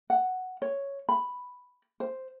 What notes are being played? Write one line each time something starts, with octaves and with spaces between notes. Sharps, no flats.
F#5
C#5
B5
C5